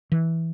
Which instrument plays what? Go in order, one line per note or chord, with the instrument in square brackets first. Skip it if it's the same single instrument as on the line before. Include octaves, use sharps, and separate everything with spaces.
[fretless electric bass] E3